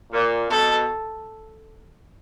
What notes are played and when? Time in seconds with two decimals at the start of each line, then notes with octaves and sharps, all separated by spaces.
0.12 A#2
0.49 B2 A4